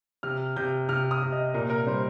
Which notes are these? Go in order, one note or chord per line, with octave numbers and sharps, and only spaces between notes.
C3 F6
C3 G6
C3 F6
D#6
C3
D#5
A#2 A#4
A#4
G3 C5